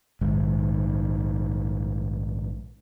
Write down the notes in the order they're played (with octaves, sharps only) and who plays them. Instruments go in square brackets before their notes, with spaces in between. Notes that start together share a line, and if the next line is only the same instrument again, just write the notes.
[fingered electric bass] A#1 G#2 D#3